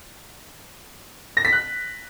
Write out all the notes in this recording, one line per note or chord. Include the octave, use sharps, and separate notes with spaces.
A#6
B6
F#6